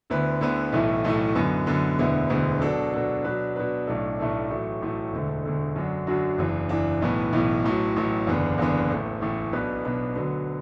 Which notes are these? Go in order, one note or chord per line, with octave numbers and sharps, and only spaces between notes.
D2 D3 B3 E4 B4
D2 D3 B3 E4 B4
B1 A2 E3 A3 E4
B1 A2 E3 A3 E4
F#2 D3 B3
F#2 D3 B3
E1 D2 D3 B3 E4
E1 D2 D3 B3 E4
B2 F#3 D4 F#4 A4
B2 F#3 D4 F#4 A4
B2 F#3 D4 B4
B2 F#3 D4 B4
B1 A2 A3 D4 A4
B1 A2 A3 D4 A4
A1 A2 F#3 A3
A1 A2 F#3 A3
E1 D2 D3 A3
E1 D2 D3 A3
F#2 D3 F#3 D4 F#4
F#2 D3 F#3 D4 F#4
F#1 E2 E3 D4
F#1 E2 E3 D4
B1 A2 E3 B3
B1 A2 E3 B3
A1 A2 F#3
A1 A2 F#3
F#1 E2 D3 B3 D4
F#1 E2 D3 B3 D4
A1 A2 A3
A1 A2 A3
B1 B2 B3 D4 B4
B1 B2 B3 D4 B4
D2 D3 F#3 B3